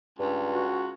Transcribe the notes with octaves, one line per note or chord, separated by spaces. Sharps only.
C#2 G2
F#4